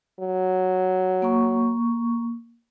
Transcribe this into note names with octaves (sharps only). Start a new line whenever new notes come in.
F#3
A#3 C#6